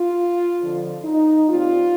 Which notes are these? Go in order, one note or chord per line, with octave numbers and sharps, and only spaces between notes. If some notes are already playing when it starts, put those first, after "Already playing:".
Already playing: F4
F2 D3 F3
D#4
A#2 G3 C4 F4